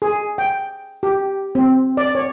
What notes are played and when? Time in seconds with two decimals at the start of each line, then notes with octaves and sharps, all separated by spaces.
0.02 G#4
0.38 G5
1.03 G4
1.55 C4
1.97 D5
2.15 C#5